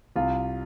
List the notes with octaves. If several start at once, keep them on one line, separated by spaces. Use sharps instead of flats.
C2 F4